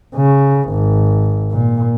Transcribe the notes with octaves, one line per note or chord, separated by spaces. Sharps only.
C#3
G#1
A#2